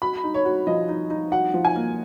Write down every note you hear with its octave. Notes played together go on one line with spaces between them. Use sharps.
F#4 B5
D#4
C#5
F#4
F3 D#5
D#4
D#4
F#4 F#5
F3
G#5
A#3